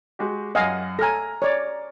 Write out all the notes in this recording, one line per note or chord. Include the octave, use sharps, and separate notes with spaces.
G#3 F#4 G4
F#2 D#5 F5 F#5 G#5
A4 G#5 A#5 F6 A#6
C#5 D5